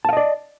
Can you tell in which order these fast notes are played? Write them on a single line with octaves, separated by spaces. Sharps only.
A5 F5 D#5 D5